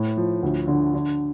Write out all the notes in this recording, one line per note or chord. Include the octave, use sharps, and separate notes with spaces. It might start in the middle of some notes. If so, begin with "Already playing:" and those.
Already playing: A2 A3
F3
D2
D3
D3